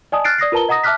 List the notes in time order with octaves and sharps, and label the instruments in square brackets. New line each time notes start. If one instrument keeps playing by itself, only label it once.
[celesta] D5 D#5 G#5 A5 D#6
F6 F#6 A6 C7 D7
D5 D#6 A#6 C7
F4 A#4 B4 A5 A#5 G7
D#5 F#5 A#5 D#6 A#6
E5 A5 D6 F6 F#6 B6